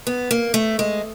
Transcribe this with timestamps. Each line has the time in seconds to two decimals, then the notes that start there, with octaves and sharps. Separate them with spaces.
0.07 B3
0.31 A#3
0.54 A3
0.79 G#3